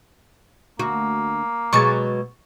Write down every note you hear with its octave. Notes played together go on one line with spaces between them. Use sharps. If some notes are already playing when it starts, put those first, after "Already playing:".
D2 A#3 F#4
B2 F#3 G#3 C#6 A6